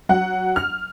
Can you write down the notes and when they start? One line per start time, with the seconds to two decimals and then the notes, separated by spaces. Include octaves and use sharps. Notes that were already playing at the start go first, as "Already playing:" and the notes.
0.09 F#3 F#5
0.56 F6